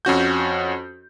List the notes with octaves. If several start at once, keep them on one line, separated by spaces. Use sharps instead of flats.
F2 C#4 F#4 G6